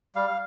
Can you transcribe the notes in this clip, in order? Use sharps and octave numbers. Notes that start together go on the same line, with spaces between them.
G3 F5